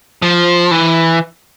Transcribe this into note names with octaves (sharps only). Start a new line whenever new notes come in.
F3
E3